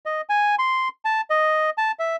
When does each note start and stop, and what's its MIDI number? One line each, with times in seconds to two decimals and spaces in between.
0.06 0.21 75
0.30 0.55 80
0.59 0.88 84
1.05 1.21 81
1.30 1.70 75
1.78 1.92 81
1.99 2.16 76